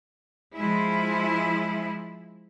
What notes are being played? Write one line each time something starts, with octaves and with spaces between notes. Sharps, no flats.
F3 G#3 E4